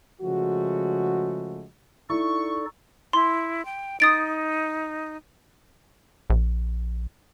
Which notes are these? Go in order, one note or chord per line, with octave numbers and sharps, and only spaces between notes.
C#3 F3 G#3 A3 F#4
D#4 E4 A4 D5 C#6
E4 C6
G5
D#4 D#6 A6 D7
A#1